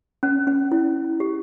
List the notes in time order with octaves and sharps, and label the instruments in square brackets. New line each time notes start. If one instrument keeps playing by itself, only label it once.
[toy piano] C#4
C#4
E4
G4